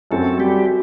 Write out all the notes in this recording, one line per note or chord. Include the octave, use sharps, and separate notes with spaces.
F#2 F#3 A3 C4 A4
G3 G4